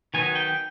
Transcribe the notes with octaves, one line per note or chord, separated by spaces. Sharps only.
D#3 F#3 B3 D#4 G#5
G5